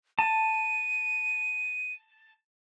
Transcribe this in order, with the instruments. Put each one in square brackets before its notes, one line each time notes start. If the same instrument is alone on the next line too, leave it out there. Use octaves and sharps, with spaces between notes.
[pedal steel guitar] A5 [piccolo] D#7